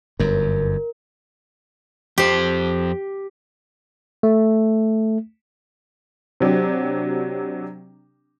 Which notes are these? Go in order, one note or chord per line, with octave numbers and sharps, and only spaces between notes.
G1 F#2 A#4
F2 G4 C5
A3
C3 F#3 D4 G4